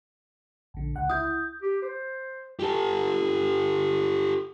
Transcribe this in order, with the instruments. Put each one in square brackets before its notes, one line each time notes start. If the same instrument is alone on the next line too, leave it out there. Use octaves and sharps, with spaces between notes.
[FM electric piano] A#1 D3
C#2 F#5
[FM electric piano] E4 [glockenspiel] D#6 G6
[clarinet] G4
C5
[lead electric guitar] G4 A4